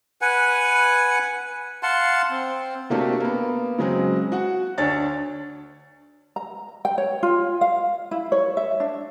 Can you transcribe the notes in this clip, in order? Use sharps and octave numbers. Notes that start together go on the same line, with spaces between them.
B4 F#5 G#5
F5 F#5 A5 C6
C4
C3 A3 A#3 D4 F#4 G4
A#3 B3
C#3 F#3 G#3 C4
F#4 F#5
D2 D4 C#5 A6
A#5
G5
C#5
F4
F5
E4
C#5
E5
D4